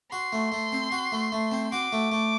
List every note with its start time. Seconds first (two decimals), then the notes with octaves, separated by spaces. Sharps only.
0.12 F#4 C6
0.33 A3
0.52 A3
0.72 C4
0.92 F#4
1.12 A3
1.32 A3
1.51 C4
1.72 F#4 D6
1.92 A3
2.12 A3